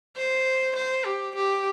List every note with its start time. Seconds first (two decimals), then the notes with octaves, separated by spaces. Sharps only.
0.16 C5
0.76 C5
1.05 G4
1.35 G4